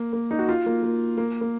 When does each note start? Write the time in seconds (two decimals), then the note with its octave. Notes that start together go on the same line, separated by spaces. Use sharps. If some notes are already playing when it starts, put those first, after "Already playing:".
Already playing: A#3
0.13 A#3
0.31 D#4
0.39 F#4
0.49 F4
0.66 A#3
0.83 A#3
1.18 A#3
1.41 A#3